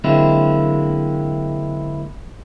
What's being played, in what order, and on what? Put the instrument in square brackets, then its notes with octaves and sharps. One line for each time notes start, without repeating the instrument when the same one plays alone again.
[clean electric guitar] D3 F#3 G#3 A#3 C4 E4